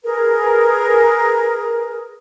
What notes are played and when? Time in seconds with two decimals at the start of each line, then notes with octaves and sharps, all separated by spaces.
0.04 G#4 A#4 B4